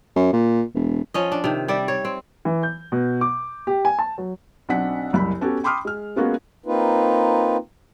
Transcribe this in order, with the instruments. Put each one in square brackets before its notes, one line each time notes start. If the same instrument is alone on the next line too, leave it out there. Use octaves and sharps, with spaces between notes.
[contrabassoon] F#2
A#2
E1
[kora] F3 C#4 D#5
D4
C3 D#3
G3 D5 E5
C#5
C4
[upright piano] E3
G6
B2
D6
G4
G#5
A5
F#3
[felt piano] B1 C4 D4 F#5 B6
F#1 C2 B5
B3 C#4 F#4 G4 A4
G5 B5 C6 D6 D#6 F6
G#3 F6
G#3 A#3 B3 C#4 F4 F#4
[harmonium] A#3 C4 D#4 F4 B4